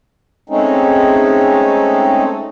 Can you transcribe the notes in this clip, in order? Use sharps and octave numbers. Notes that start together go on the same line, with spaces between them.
G#3 A3 C4 C#4 D#4